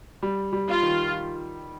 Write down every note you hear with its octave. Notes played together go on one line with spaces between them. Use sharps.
G3
G3
F4
D#3